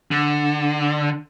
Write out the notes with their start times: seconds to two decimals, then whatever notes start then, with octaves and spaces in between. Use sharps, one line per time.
0.11 D3